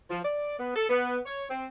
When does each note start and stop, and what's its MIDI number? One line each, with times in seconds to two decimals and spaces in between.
0.10 0.20 53
0.24 0.56 74
0.58 0.75 59
0.75 0.85 69
0.89 1.18 59
1.25 1.45 73
1.49 1.65 60